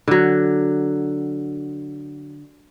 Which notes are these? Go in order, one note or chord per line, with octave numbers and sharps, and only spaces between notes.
D3 F#3